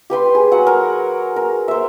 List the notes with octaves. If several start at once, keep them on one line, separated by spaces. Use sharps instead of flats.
G4 B4 G5 C6
G#4
F#3 F#5
A#4
A#4
C5 E5